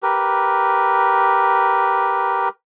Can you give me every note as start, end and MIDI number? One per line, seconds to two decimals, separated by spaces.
0.03 2.49 67
0.03 2.49 70
0.03 2.49 71